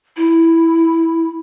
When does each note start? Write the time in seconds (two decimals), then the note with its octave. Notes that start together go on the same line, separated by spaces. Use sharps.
0.16 E4